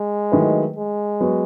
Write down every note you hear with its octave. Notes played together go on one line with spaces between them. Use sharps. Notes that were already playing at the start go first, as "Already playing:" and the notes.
Already playing: G#3
D#3 F#3 A3 E4 B4
G#3
F#3 B3 F#4